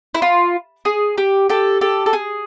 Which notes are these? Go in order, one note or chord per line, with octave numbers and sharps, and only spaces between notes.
E4
F4
G#4
G4
G4 A4
G4 A4
A4
G#4